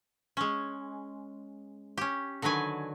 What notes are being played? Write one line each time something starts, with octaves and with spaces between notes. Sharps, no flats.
G#3 C#4
C#4 G4
D3 D#3 F#3 B4 G#5